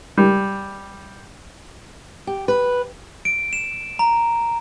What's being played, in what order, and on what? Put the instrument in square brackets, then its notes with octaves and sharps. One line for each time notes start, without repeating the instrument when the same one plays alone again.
[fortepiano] G3
[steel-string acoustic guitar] G4
B4
[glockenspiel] D7
E7
A#5